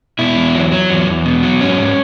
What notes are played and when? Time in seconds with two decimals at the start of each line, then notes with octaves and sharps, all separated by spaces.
0.19 B2 E4
0.36 E2
0.54 F#3
0.72 F#3
0.90 E2
1.07 E2
1.25 B2
1.42 F#3
1.61 G#2 C#4
1.78 G#2